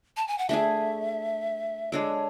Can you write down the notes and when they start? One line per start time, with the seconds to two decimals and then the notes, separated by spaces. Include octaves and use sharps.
0.17 A5
0.28 G#5
0.38 F#5
0.49 A3 D4 G#4 E5
1.92 G#3 D4 A4 C#5